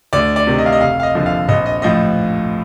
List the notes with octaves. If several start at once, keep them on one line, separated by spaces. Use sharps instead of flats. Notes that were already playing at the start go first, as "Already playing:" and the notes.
D2 D5
D5
C3 D#3
D#5
F5
D#5
F1 F5
F5
D#5
D#2 D3 F3
F5
A#1 D#5
D#5
A2 F3 D#5